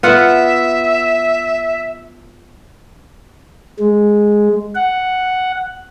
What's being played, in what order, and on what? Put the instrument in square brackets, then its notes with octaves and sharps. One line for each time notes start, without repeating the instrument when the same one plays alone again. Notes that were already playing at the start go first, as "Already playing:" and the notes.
[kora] B3 F4 F#5 [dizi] E5
[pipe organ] G#3
F#5